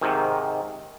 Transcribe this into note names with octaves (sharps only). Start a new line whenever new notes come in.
G#2 C3 D#3